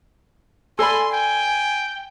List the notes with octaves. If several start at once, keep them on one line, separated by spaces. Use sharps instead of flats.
A4 D5 G#5 B5 C6
G5 G#5